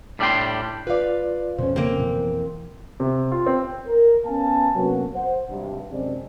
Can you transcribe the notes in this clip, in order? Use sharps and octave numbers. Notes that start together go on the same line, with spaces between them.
A2 G3 D4 D#5 G5 C6
F4 B4 D5 F5
F2 B2 C#4 C5
C#3 A#3 C4
B2 E3
C3
F4
C4
A#4
B3 C#4 F5 G#5 A5
C3 F#3 A#3 B3 C#4 F#4
C5 F#5
G#1 G2 C3
F#2 C3 G#3 C4 D4